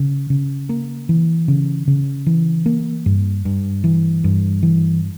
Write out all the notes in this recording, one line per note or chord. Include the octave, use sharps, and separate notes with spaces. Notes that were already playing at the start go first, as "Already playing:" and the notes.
Already playing: C#3
C#3
A#3
E3
C#3
C#3
E3
A#3
G2
G2
E3
G2
E3